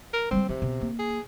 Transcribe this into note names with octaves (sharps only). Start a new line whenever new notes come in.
A#4
G3 G#3 C4
C3 F3
B2
A#3
G#4